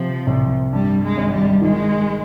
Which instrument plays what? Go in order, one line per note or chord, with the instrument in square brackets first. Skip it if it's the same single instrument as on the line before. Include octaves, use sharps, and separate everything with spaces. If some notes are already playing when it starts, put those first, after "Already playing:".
Already playing: [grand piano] C3 [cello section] F3
[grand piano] C2
[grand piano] G2 [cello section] G3
[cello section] G#3
[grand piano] G#1
[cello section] G3
[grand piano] D#3 [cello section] G#3